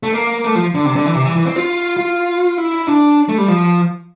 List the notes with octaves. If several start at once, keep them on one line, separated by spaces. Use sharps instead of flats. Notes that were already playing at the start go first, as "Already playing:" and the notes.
A3
A#3
A3
F3
D3
C3
D3
E3
C3
E3
E3
C4
F4
F4
E4
D4
A3
G3
F3